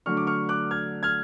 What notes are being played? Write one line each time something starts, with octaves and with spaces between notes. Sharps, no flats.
D3 F#3 A3 D4 C#6 F6
D6
C#6 F6
D6 F#6
F6 G#6
F6 G#6